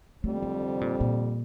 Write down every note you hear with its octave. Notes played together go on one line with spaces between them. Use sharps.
F2 D3 G3 A3 C4
A3
C3
A#2
A#2